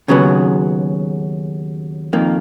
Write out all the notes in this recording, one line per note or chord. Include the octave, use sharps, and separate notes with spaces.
D#2 C#3 F#3 B3
F2 D#3 A#3